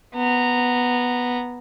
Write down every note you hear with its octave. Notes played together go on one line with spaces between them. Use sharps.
B3 A#5